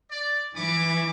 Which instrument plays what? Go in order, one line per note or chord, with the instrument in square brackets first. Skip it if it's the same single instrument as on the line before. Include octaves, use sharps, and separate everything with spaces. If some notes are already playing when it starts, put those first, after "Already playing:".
[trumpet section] D5
[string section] E3 [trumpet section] B5 C#6 D6